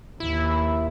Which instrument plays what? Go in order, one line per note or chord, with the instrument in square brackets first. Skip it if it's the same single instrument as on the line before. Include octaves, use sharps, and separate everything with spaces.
[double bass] D#2 [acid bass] E4